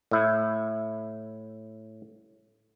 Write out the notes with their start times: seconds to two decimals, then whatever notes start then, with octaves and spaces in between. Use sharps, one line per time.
0.11 A2 E4